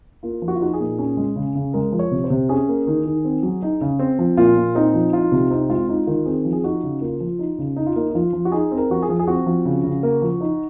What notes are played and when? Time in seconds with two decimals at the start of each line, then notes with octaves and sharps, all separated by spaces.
0.23 A#3 F4
0.42 F3
0.48 F#4
0.55 F4
0.61 D#4 F#4
0.74 G#4
0.80 A#2
0.98 C#4
1.17 G#3
1.36 C#3
1.55 C#3
1.73 G#3 A#4
1.92 F3
1.99 C#5
2.11 C3
2.24 C5
2.30 C3
2.49 C#4 G#4
2.69 A#3
2.87 D#3
3.06 D#3
3.25 C4
3.43 F#3
3.63 D#4
3.81 C#3
3.99 C4
4.19 F3
4.37 A#2 F4
4.57 A#2
4.75 C4 D#4
4.94 F3
5.13 D#4 F4
5.32 C3
5.51 C4 D#4
5.69 G#3 F4
5.89 D#4 F4
6.07 D#3 F4
6.26 C4 G#4
6.45 F3
6.53 G#4
6.64 D#4 F#4
6.83 C#3
7.01 A#3 F4
7.20 F3
7.39 D#4
7.59 C#3
7.76 D#4
7.86 F4
7.96 A#3 D#4
8.10 D#4
8.15 F3 F4
8.33 F3
8.45 F#4
8.52 D#4 G#4
8.71 C4
8.77 A#4
8.90 F3 F#4
9.02 G#4
9.09 F3
9.19 G#4
9.27 C4 F#4
9.46 F3
9.65 C#3
9.84 C#3
10.03 A#3
10.22 F3
10.41 D#4